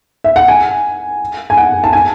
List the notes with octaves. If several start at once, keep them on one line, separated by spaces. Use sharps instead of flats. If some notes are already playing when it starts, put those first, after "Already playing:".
E5
F#5
G#5
G#5
F#5
A5
G#5